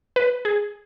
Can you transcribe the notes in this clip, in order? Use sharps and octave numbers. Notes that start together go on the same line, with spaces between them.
B4
G#4